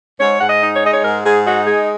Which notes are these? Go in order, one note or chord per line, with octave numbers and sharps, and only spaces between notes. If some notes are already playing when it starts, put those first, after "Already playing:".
G#2 C#5
G#2 F#5
D#5
D#4
C#5
G#3 D#5
C#5
G#2 A#4
G#2 G#4
D#4 F#4
G#3 G#4